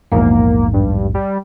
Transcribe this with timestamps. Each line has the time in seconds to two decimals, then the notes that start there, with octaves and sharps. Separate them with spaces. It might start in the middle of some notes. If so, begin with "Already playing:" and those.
0.12 A#1 E2 G#2 A#3
0.73 G2
1.14 G3